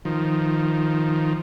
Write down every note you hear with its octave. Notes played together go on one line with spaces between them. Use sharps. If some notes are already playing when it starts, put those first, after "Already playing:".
D#3 F3